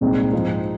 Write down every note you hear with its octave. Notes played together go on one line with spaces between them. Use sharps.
C2 A#2 G#3 C4 D#4
G#2 F3 C4 D#4